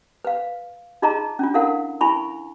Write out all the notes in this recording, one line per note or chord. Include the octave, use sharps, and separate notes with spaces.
B4 F5
D#4 F4 G#4 D#5 A5 A#5
C#4 D4 F4
E4 A4 A#4 F5 F#5
E4 G#5 B5 C#6